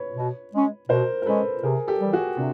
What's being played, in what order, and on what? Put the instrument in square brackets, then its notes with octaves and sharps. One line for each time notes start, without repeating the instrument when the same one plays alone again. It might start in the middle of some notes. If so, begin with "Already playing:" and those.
Already playing: [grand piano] B4 C#5
[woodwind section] B2
G#3 C#4
[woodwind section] B2 [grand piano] A#4 C5
[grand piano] A#4
[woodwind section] G#3 C#4 [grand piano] A4 B4
[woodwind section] C3 [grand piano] G#4 A#4
[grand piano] G4 A4
[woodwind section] E3 G3
[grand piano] F#4 G#4
[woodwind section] C3 [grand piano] C4 D4